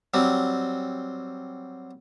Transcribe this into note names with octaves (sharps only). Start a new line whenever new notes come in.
F#3 G3 C4